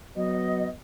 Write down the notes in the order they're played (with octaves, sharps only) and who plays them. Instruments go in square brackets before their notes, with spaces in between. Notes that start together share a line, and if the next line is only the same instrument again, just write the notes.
[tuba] F#3 [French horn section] B3 [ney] D#5